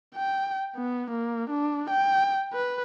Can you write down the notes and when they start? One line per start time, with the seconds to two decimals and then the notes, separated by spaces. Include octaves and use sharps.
0.16 G5
0.77 B3
1.11 A#3
1.50 D4
1.90 G5
2.53 B4